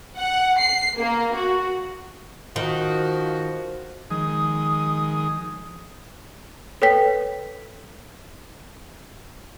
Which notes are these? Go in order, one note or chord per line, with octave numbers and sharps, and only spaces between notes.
F#5
C7
A#3
F#4
D#3 F3 F#4
D#3 F3 G#3 D#6
A4 B4 C#5 G5 B6